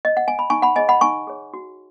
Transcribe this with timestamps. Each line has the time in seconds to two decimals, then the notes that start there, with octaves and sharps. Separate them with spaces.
0.05 D#5
0.17 F#5
0.28 G#5
0.39 B5
0.50 D#4 G#5 C#6
0.62 F#5 B5
0.76 G#4 C#5 D#5 G#5
0.89 F#5 B5
1.01 D#4 G#5 C#6
1.27 G#4 C#5
1.54 F#4